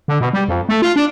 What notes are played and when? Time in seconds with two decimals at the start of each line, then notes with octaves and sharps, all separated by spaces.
0.08 D3
0.21 B2
0.33 G3
0.48 F2
0.69 A3
0.82 F4
0.96 D4